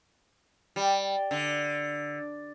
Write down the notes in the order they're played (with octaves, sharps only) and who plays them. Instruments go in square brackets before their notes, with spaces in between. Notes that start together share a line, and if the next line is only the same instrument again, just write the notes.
[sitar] G3
D3